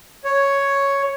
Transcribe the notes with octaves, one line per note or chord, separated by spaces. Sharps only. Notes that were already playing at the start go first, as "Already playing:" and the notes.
C#5